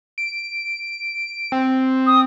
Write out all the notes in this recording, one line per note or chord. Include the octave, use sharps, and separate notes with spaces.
D7
C4
D#6